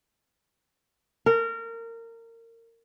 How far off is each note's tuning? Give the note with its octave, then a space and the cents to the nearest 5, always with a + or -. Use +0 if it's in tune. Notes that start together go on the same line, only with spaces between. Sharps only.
A#4 -25